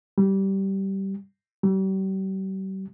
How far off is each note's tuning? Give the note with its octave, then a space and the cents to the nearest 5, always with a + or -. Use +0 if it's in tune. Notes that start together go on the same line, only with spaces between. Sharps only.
G3 -15
G3 -40